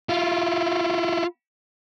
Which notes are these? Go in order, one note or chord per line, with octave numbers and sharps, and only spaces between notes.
E4 F4